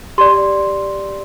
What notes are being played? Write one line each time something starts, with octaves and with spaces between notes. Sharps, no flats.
G4 D5 C6